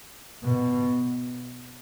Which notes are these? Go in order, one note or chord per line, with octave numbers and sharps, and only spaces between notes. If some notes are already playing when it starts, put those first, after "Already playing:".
B2